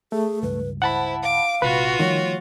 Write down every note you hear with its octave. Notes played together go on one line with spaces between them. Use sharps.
A3 G#4
C#2 G2 B4
E4 C5 F#5 A5 B5
F5 D6
A#1 C3 F4 F#4 B4
D#3 F3 G3 A3 C#5